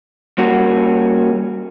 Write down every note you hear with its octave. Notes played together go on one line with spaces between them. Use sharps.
G3 A#3 C#4 F#4